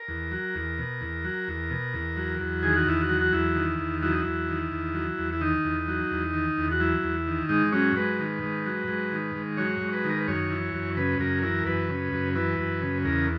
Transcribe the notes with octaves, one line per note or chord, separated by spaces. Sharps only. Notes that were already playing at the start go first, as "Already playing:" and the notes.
Already playing: A#4
E2
F#3
E2
B2
E2
F#3
E2
B2
E2
F#3
E2
D#3 G#4
F#4
E2 E4
F#4
F#3
F#4
E2 E4
D#3
E2
F#3 E4
D#4
E2 E4
D#3
E2
F#3
E2
E4
D#3 D#4
E2
F#3
E2
D#3
E2
F#4
F#3 E4
E2
D#3
G#2 D#4
F#3 C#4
G#2 B4
D#3
G#2
F#3
G#2
D#3
G#2
F#3 C#5
G#2
B4
D#3
A#4
B4
F#2 C#5
E3
F#2
C#3 B4
F#2 A#4
E3 A#4
F#2 B4
C#3
F#2
E3 B4
F#2
C#3
E2 A#4